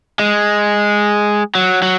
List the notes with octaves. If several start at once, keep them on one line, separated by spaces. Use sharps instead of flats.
G#3
F#3
F#3